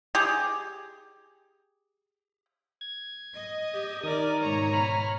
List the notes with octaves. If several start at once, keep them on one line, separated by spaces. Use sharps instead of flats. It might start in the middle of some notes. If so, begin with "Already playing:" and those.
G4 G#4
G#6
D#5
G4
D#3 A#4 D5 D#6
G#2 B2 C#5 A#5
B5 F6